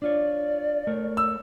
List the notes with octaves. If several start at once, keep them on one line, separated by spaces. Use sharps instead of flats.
D4 F4 C#5 D5
A3 A#4 C#5
E6